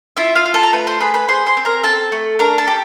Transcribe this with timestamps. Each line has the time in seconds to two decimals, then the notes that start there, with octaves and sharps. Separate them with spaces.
0.17 E4 F4 E5
0.35 F4 F5
0.46 F4
0.54 A4 A5
0.63 A#5
0.73 A3 B4 B5
0.87 C5 C6
1.00 G#4 B4 B5
1.14 B4 B5
1.28 G#4 C5 C6
1.46 C5 C6
1.57 C4
1.65 A#4 A#5
1.83 C4 A4 A5
2.12 A3
2.39 D4 A#4 A#5
2.58 A4 A5
2.68 G4